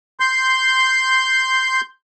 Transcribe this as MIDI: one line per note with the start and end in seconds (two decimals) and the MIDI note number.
0.20 1.81 84
0.20 1.81 91